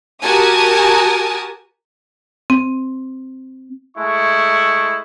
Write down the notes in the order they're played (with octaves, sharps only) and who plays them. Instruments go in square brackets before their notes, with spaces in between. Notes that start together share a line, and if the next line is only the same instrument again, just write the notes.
[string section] F#4 G4 A#4 G#5 A5 D#6
[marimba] C4
[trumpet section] G#3 A3 E4 C#6